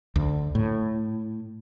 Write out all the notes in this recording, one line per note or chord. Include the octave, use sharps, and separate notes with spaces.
D2
A2